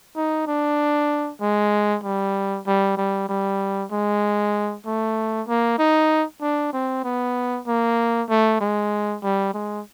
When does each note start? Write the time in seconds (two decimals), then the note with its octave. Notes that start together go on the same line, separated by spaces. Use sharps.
0.16 D#4
0.47 D4
1.41 G#3
2.03 G3
2.66 G3
2.97 G3
3.29 G3
3.91 G#3
4.86 A3
5.48 A#3
5.79 D#4
6.41 D4
6.73 C4
7.04 B3
7.67 A#3
8.29 A3
8.61 G#3
9.23 G3
9.54 G#3